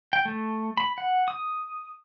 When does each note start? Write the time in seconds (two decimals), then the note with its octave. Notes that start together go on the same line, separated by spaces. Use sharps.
0.13 G5
0.25 A3
0.77 B5
0.98 F#5
1.28 D#6